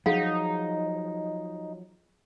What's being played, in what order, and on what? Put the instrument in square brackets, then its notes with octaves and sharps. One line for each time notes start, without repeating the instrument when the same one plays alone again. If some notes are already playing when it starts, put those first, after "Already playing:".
[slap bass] F3 F#3 [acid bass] D#4 [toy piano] G#4 F5 F#5